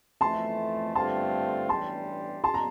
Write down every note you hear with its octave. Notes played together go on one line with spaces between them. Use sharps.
F2 E3 A3 A5 C6
G2 D3 A3 C4 F4 A5 C6
A1 G2 E3 G3 D4 A5 C6
A5 C6
A#5